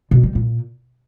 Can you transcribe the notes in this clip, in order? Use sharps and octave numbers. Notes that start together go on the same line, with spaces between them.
B2
G3
A#2